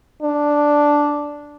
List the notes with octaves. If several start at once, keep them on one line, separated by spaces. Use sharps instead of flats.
D4